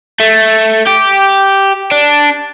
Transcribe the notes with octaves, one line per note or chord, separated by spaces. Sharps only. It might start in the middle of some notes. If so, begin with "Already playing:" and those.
A3
G4
D4